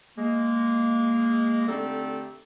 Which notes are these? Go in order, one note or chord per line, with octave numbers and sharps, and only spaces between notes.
G#3 A#3
D3 A3 C4 D#4 G4 A4